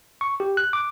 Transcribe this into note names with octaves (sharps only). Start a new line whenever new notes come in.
C#6
G4
F#6
D6